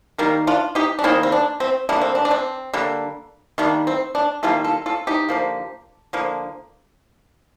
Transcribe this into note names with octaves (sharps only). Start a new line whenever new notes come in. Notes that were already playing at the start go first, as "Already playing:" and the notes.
D#3 G3 A#3 A#4
D4 F4
D#4 G4
D4
D#3 G3 A#3 C4 D#4
C4
D4
C4
D3 G3 A#3 D4
C4
D4
D4
C4
D3 G3 A#3
D#3 G3 A#3 D4
C4
D4
D#3 G3 A#3 F4 A4
F4 A4
F4 A4
D#4 G4
D3 F3 A#3
D3 F3 A#3